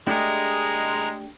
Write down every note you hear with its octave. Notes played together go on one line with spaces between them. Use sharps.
G#3 A3 D4 E4 G4 A#4